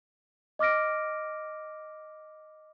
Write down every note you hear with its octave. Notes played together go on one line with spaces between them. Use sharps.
D#5 D6 F6 A#6 D7